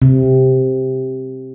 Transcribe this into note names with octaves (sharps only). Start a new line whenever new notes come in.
C3